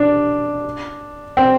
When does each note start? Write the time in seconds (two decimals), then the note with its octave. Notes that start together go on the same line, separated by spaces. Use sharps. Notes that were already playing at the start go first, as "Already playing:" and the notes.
Already playing: D4
1.37 C4